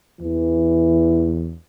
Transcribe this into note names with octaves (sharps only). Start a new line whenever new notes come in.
E2 E3